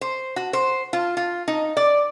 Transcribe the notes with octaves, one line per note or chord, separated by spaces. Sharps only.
C5
F#4
C5
F4
F4
D#4
D5